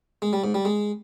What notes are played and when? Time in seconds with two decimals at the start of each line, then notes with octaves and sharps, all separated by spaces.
0.22 G#3
0.33 G3
0.44 G#2
0.54 G3
0.65 G#3